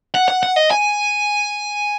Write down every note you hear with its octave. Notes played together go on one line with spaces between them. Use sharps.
F#5
F#5
F#5
D#5
G#5